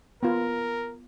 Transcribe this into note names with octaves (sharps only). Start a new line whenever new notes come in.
B3 F4 A#4